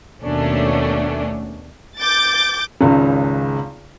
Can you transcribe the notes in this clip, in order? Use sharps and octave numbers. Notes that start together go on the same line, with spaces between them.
D#2 B2 A3 C#4 D4
D6 G6 A6
G#1 C#2 C#3